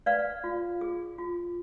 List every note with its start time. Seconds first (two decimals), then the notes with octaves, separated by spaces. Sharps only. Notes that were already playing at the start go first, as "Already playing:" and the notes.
0.06 B4 D5 F5
0.44 F4
0.81 G#4
1.18 F4